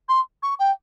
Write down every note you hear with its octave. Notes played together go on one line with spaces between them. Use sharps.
C6
C#6
G5